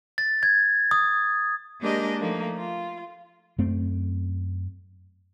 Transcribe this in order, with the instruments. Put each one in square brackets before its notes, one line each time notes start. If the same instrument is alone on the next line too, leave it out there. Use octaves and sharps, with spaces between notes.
[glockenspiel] A6
G#6
D#6
[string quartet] G#3 A#3 D4 G4 A#4 D#5
F3 A3 A#3 D#4
F4
[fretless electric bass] F#2 A3 C4